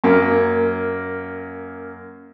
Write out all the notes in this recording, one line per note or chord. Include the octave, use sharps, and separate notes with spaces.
F#2 A#3